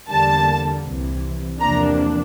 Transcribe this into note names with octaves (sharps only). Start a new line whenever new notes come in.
E2 D3 G3 A#3 A5
C2 C3 E3
E2 C3 F3 A#3 D4 A#5